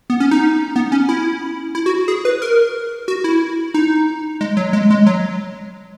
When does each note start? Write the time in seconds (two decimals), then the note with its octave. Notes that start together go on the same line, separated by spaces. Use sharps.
0.10 B3
0.20 C#4
0.31 D#4
0.76 B3
0.92 C#4
1.09 E4
1.75 E4
1.86 F#4
2.08 G#4
2.25 B4
2.42 A#4
3.08 F#4
3.24 E4
3.74 D#4
4.41 G#3
4.57 F#3
4.73 G#3
4.90 G#3
5.06 F#3